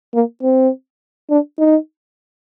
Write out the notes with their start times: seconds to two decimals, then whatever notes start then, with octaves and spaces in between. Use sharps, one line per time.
0.14 A#3
0.42 C4
1.30 D4
1.58 D#4